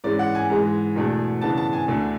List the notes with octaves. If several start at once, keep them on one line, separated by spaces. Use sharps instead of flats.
G#2 E3 G#3 C#4 D5
F#5
G#5
G#2 E3 G#3
E2 B2 A3 D4
C#3 E3 B3 D4 A5
A5
G#5
D2 D3 A3 D4